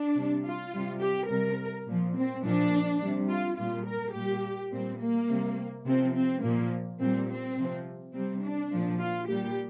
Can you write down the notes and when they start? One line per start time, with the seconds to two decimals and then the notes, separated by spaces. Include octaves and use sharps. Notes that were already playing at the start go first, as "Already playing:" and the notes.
Already playing: D4
0.15 C3 G3
0.44 F4
0.73 C3 G3
1.01 G4
1.29 C3 G3 A#4
1.87 A#2 F3
2.16 C4
2.43 A#2 F3 D4
3.01 C3 G3
3.29 F4
3.58 A#2 G3 F4
3.86 A#4
4.15 A#2 G3 G4
4.72 A#2 G3 C4
5.00 A#3
5.29 C3 G3
5.86 C3 F3 C4
6.15 C4
6.43 A#2 F3 A#3
7.00 A#2 G3 C4
7.29 C4
7.57 C3 F3
8.14 C3 G3 C4
8.43 D4
8.72 A#2 F3
9.00 F4
9.29 A#2 G3 G4